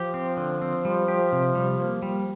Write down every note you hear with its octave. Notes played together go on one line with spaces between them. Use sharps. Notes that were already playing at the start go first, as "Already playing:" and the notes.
Already playing: F3 G4
C4
D3
C4
G3
G4
C3
G3
A#3
G3